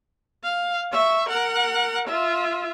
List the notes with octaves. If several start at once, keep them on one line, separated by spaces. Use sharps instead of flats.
F5
E5 C#6
A#4 F#5
F4 E5